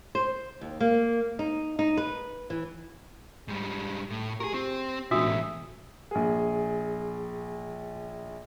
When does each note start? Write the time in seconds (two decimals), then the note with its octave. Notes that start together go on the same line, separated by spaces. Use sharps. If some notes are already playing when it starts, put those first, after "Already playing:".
0.15 C5
0.61 D#2
0.80 A#3
1.39 D#4
1.79 D#4
1.97 B4
2.50 E3
3.48 G#2 G3
4.10 A2
4.40 G4 G#4 A#4
4.54 C4 G4
5.11 A1 G#2 B2 D4 F#4 E5 D#6
6.11 A#1 G#4